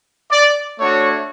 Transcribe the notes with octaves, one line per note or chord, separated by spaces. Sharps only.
D5
A3 D4 F#4 C#5